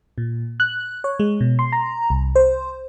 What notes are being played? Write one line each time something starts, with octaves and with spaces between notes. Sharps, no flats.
A#2
F#6
C#5
G#3
B2
C6
A#5
C2
C5